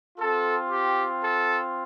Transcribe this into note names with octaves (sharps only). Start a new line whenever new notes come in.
C4 F4 A4
G4
A4